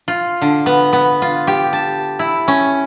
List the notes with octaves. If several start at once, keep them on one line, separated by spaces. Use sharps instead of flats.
F4
D3
B3
B3
F4
G4
A5
E4
C#4